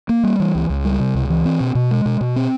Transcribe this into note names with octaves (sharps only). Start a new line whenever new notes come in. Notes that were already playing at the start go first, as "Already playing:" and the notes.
A#3
G3
E3
C#2
C#2
G3
C3
C#2
E3
C4
B2
B2
G#3
B2
B2
C4